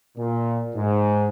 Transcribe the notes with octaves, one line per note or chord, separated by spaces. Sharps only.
A#2
G#2